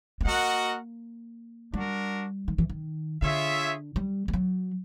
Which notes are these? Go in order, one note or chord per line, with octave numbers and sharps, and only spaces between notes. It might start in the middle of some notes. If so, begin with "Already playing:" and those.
B3
A#3 F#4 A#4 D#5 F#5
G3 D4 F#4 A#4
D#3
E3
D#3
D3 F4 G#4 C#5 E5
G3
G3
F#3